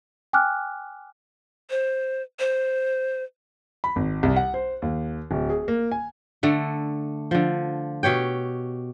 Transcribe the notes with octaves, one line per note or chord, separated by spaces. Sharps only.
G5 G#5 D6 F6 F#6
C5
C5
B5
G#1
C2
F#5
C5
D#2
D1
G#4
A#3
G#5
D3 A3
D3 F3
B2 G4 C#5 G5